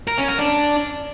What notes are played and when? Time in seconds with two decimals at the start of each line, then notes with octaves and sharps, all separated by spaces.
0.08 A#4
0.18 C#4
0.28 A#4
0.39 D4